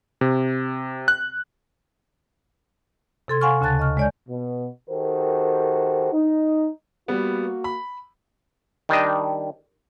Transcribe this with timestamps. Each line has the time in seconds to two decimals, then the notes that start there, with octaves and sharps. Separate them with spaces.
0.21 C3
1.08 F#6
3.28 C3 A4 C6 G#6
3.41 F5 F#5 G#5 C6 C#6 F6
3.61 D2 C#3 A5 F#6 A6
3.79 D#5 C#6 F6
3.97 G#3 C#5 D5 G#5 G6
4.29 B2
4.90 D#3 F#4 G4 A4 A#4 C5
6.13 D#4
7.08 G3 A#3 B3 F#4
7.64 B5
8.89 D#3 G3 D4 D#5